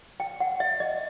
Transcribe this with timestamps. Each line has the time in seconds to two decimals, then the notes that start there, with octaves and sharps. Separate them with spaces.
0.20 G5
0.40 F#5
0.60 E5
0.80 D#5